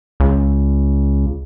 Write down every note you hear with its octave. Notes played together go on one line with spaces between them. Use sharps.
C#2